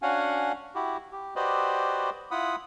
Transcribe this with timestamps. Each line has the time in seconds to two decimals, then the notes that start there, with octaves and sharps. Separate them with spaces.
0.02 C#4 D4 F#4 F5 F#5 G#5
0.75 E4 F#4 G4
1.12 G4
1.36 F#4 G4 B4 C5 D5 D#5
2.31 E4 F4 F#5 B5 D#6